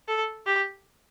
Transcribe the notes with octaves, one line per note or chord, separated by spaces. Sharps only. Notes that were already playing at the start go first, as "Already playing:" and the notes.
A4
G4